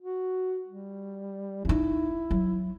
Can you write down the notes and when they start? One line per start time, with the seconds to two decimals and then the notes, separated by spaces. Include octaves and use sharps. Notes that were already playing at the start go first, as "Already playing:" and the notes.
0.01 F#4
0.67 G3
1.65 C#4 D#4 E4
2.31 F#3